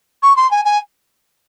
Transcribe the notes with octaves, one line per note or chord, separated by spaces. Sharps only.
C#6
C6
G#5
G#5